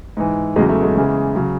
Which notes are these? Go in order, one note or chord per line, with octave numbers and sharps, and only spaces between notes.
G#2 E3
E2 C#3 F#3 G#3
A3
G#3
E2 C#3 E3
C#3 F#3